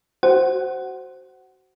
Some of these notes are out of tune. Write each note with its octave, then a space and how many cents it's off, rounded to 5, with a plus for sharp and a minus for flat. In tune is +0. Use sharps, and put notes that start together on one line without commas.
F#4 +20 C5 +0 F#5 +15